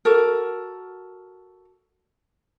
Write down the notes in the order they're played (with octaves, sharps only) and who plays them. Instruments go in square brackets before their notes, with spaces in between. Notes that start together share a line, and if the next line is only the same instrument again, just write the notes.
[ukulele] F#4 A4 A#4